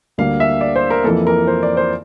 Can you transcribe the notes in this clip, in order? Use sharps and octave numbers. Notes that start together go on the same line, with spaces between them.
D2 D3 G3 A#3 F5
E5
D5
C5
A#4
F2 E3 A#3 A4
A#4
C5
D5
C5